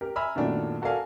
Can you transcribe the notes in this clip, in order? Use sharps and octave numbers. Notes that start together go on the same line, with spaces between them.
G4 A#4
E5 G#5 A#5 B5 E6 F6
F#2 A#2 D#3 A3 B3 D4
F#4 A4 A#4 D5 F5 G#5